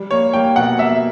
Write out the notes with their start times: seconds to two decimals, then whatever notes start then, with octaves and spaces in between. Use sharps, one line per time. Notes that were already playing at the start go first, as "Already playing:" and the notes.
Already playing: G3
0.11 A#3 C#5
0.33 A#3 G5
0.56 B2 F#5
0.79 A#3 E5